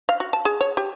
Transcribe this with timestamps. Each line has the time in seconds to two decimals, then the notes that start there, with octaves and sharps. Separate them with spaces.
0.09 F5
0.20 F#4
0.33 A5
0.45 G#4
0.61 C#5
0.77 G4